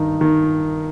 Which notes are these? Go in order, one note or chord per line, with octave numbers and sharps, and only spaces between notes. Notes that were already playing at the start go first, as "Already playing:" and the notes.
Already playing: G2 D#3 D#4
D#3